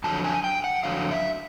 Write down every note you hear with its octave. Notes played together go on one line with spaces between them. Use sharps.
F2 D3 F#3 A5
G#5
G5
F#5
F2 D3 F#3 F5
E5